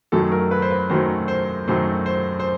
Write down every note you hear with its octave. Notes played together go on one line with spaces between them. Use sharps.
F#2 D#3 F#3 A3 A4
A#4
B4
C5
B4
F#2 D#3 F#3 A3 C5
C5
F#2 D#3 F#3 A3 C5
C5
C5